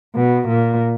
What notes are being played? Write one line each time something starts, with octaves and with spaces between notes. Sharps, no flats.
B2
A#2